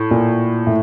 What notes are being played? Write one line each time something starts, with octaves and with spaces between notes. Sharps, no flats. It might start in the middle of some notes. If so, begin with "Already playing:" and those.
Already playing: A2
A#2
A2